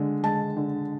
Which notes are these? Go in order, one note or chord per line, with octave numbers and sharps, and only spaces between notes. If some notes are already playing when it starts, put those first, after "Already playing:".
Already playing: D3 G#3
G#3 A5
D3